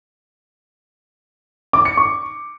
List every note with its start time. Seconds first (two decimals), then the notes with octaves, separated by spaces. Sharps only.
1.73 D6
1.85 C#7
1.97 C#6